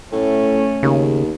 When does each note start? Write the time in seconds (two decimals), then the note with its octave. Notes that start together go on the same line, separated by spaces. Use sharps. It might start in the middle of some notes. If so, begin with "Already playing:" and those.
0.12 A2 A3 C#4
0.83 D#2 C#3